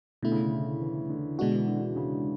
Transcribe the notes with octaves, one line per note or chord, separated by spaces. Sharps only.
B2 D3 A3 E4
C#3
D3
E3
D3
B2 D3 G#3 D4 F#4
E3
D3
D3
C#3